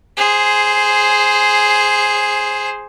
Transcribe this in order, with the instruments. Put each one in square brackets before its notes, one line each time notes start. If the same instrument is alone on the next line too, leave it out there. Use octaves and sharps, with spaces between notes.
[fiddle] G#4 C5